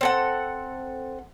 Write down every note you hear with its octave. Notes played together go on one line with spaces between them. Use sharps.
C4 A4 F#5